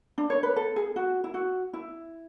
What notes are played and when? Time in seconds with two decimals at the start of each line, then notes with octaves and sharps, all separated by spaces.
0.18 D4
0.30 C#5
0.43 B4
0.56 A4
0.76 G#4
0.96 F#4
1.24 E4
1.34 F#4
1.73 E4